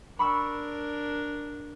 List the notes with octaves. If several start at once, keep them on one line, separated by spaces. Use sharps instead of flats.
D4 A#4 B5 C#6 E6